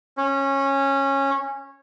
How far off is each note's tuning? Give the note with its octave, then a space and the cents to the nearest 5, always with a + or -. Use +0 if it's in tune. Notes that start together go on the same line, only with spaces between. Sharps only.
C#4 -15